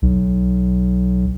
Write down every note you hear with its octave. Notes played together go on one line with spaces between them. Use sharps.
B1